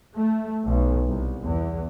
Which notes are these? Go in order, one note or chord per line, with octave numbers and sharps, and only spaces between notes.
A3
B1
C2
E2